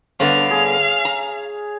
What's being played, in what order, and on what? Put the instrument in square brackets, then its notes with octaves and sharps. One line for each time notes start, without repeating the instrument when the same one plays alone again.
[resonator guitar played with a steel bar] G2 D3 B3 [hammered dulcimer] C#5 [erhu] F5
[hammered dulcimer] G#4
[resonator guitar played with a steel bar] A#5